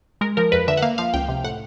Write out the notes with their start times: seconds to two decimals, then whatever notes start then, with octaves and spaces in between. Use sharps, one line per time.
0.21 G#3 A#4
0.37 F3 A#4
0.52 F2 B4
0.68 D3 E5
0.77 F#5
0.82 A#3 F5
0.98 F3 F5
1.14 C#2 G5
1.29 C3
1.44 A2 F#5